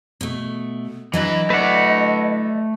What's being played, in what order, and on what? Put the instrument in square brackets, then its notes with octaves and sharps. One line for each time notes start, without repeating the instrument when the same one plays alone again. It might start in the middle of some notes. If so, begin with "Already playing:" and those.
[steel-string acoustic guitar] B2 A3
[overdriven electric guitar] E3 B4 [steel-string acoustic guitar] F#3 D4 E4 [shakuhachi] D#5
[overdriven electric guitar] A3 D5 [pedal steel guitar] B4 F#5